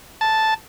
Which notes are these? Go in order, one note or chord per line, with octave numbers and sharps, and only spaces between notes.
A5